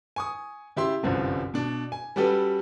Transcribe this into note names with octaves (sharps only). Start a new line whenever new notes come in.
G#5 C#6 D#6
C#3 E4 G4 E5 C6
G1 C2 F#2 F3
B2 D4
G#5
G3 C#4 F#4 G4 A4 B4